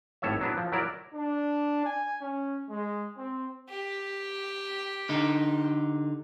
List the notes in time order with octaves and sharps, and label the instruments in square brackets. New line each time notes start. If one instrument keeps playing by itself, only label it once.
[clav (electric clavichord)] G#1 A2 A4 C#5 E5
F#3 B3 D4 E4
F3
F#3 E4 A#4 D5
[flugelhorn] D4
G#5
C#4
G#3
C4
[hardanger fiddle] G4
[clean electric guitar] D3 D#4